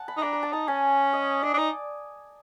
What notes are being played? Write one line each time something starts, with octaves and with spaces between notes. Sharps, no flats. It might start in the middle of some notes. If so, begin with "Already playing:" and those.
Already playing: F#5 A5
B5
D#4
D4 A#5
A#5
A5
D#4 A5
C#4 G#5
D#5
D4 D#5
D4
D#4 D5